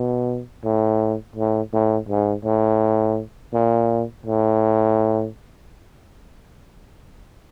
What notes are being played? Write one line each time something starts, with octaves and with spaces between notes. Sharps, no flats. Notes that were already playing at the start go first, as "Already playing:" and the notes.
Already playing: B2
A2
A2
A2
G#2
A2
A#2
A2